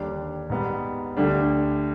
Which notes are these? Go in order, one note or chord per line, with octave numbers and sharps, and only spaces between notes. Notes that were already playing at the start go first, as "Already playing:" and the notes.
Already playing: D#2 D3 G3 D4
G#2 G3 B3
D2 D3 G3 D4